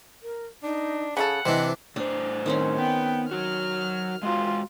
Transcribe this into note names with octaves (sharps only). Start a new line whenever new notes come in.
A#4
D4 D#4
C#3 D#4 G#4 A4 F#5
C3 E3 C4 D4 D#5
A2 D4 C5
D#3 C4 C#4
B3 G5
F#3 F#4 F6
G#3 F4 F#4